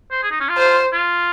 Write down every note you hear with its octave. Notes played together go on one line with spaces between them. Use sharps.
C5
G#4
D#4
C#4
F4
C5
F4